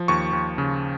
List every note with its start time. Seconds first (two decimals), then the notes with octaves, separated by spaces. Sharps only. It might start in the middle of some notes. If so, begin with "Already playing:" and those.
Already playing: F3
0.08 D#2 C#6
0.33 D#2
0.58 C#3